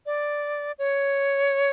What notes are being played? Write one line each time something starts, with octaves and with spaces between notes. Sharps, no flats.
D5
C#5